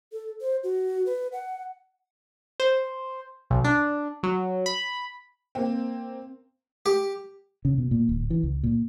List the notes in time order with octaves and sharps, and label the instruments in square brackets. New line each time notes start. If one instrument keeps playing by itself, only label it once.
[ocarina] A4
C5
F#4
B4
F#5
[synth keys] C5
B1
D4
F#3
B5
[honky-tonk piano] A#3 C4
[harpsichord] G4
[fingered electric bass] C#3
B2
A#2
D1
E3
C#2
A#2